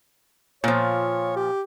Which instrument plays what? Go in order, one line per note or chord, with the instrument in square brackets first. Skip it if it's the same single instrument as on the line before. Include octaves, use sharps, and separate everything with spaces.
[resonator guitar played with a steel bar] A#2 F3 [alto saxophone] C#5
[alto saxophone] G4